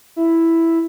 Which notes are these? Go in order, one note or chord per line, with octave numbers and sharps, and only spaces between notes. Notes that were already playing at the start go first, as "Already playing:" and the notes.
E4